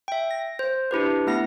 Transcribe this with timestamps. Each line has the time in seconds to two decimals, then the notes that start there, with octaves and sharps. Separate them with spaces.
0.08 E5 G5
0.31 A#6
0.59 C5
0.91 D4 E4 G4 B4
1.27 A3 B3 E4 A#6